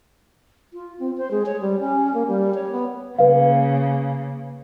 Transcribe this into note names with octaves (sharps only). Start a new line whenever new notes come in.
F4
C4
C5
G#3
C#5
G3
C#4
A#3
G3
C#5
B3
C#3 A#3 B4 F5